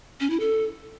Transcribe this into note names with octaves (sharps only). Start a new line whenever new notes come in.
C#4
E4
A4